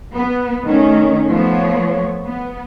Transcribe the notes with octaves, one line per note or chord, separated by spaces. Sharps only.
B3
D#3 A3 C#4
F3 A3 B3 C#5
B3